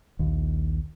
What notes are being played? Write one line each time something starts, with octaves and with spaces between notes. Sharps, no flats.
A#1 D#2